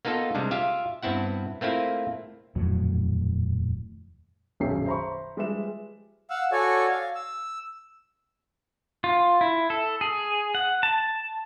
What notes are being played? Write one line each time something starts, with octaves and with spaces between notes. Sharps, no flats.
A#3 B3 D#4 F4 A4
C3 G3 G#3 D4
F4 G4 E5 F5
G2 B3 C4 E4 F#5
A3 A#3 C4 E4 F4
D#1 F2 A2 F#3
D#1 B1 F#2 G#4 G5 C7
C5 E5 A#5 B5 C#6
F3 G3 G#3 B4 E5 E7
F5 F#5 E6
F#4 A4 C#5 D5 G#5
F5
E6
F4
E4
A4
G#4
F#5
A5